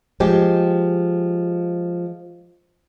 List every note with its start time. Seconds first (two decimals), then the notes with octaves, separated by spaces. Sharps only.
0.20 F3 G#3 G4